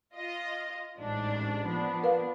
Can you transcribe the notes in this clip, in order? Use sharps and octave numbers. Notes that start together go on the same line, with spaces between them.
F4 D#5
A1 G#2 D4
F3 B3 D4
A#4 B4 F5